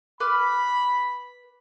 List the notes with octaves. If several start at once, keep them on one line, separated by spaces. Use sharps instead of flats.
B4 B5 D6 F6